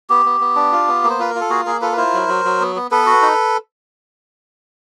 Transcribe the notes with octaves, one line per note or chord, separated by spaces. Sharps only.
B3 G4
B3
B3
D4
F4
B3
A#3
C5
F4 B4
A#4
F4
A4
A#3 F#4 G#4
A#3 G#4 A#4
F4 A4 B4
B4
E4 A#4 C5
F#3
F#3
F#3
B3
B3
B3 A4 B4
F#4
D#4